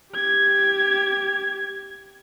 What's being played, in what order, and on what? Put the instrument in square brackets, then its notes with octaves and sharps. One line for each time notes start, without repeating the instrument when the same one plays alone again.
[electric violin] G4 G#6